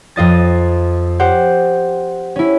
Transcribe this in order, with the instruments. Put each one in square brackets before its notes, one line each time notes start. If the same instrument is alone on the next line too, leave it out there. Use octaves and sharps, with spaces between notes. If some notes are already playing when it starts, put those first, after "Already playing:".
[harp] F2 F4 D#5 A6
G4 C5 F#5
C#4 E4